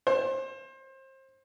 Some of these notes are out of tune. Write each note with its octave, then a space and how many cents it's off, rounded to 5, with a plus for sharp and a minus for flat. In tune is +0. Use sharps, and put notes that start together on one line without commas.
C5 +30